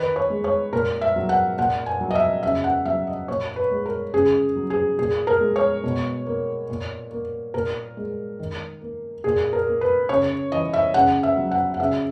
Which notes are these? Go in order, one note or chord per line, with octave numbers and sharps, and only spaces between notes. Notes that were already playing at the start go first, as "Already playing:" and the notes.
Already playing: D#3 B4
C#5
G#3
C#5
A#2 A#4
E5
F#3
F#5
A#2 F#5
G#5
F#3
D#5
E5
C#3 E5
F#5
F#3 E5
D#5
A#2 C#5
B4
G#3
A#4
C#3 G#4
F#3
G#4
A#2 G#4
A#4
G#3
C#5
B2
A#3
A#2
A#3
A#2 A#4
G#3
D#3
A#3
A#2 G#4
A#4
A#3
B4
C#3 C#5
E3 D#5
E5
C#3 F#5
E5
F#3
F#5
F#5
C#3 E5